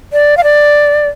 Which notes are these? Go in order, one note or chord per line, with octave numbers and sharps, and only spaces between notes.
D5
F5
D5